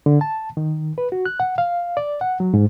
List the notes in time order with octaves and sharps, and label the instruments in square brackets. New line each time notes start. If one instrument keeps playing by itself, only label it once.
[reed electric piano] D3
A5
D#3
B4
F#4
F#6
F#5
F5
D5
F#5
F#3
G#2